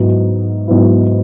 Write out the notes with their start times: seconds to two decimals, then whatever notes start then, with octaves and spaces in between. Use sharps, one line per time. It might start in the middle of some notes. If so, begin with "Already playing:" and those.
Already playing: G#2 F#3 B3 E4
0.68 G#2 F#3 B3 E4